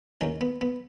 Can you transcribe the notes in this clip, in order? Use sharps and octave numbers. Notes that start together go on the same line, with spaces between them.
D#2 D#3 C#4
B3
B3